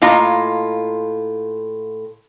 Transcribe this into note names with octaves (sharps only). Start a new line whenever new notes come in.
A2 A#3 F4 D#5 A#5